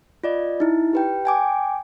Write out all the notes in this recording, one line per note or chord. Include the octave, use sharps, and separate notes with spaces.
F4 D5 D#5
D#4 E4
G4 B4 G5
G5 G#5 D6